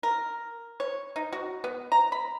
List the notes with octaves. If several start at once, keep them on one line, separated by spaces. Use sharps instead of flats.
A#4
C#5
D#4
F#4
B3
A#5
B5